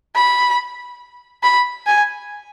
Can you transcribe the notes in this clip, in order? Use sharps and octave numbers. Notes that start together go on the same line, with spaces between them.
B5
B5
G#5